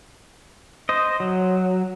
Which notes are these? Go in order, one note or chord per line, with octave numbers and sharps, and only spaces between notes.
C5 D#5
F#3